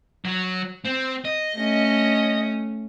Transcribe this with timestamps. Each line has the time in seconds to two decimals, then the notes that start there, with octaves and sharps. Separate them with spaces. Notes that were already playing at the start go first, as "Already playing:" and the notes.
0.25 F#3
0.85 C4
1.25 D#5
1.55 A3 C#4